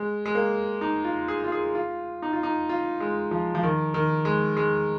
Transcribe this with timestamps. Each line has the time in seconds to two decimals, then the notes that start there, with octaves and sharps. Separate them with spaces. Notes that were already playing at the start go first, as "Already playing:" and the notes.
Already playing: G#3
0.25 G#3
0.35 A#3
0.81 D#4
1.04 F4
1.28 G#4
1.44 F4
1.52 G#4
1.75 F4
2.22 D#4
2.33 F4
2.43 D#4
2.69 F4
3.00 G#3
3.31 F3
3.55 F3
3.63 D#3
3.94 D#3
4.25 G#3
4.57 G#3